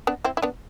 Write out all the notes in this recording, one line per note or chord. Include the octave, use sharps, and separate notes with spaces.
B3 D4
C4 E4
E4
B3 D4